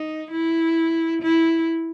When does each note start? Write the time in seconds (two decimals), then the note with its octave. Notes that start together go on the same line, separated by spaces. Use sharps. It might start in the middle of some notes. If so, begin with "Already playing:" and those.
Already playing: D#4
0.31 E4
1.22 E4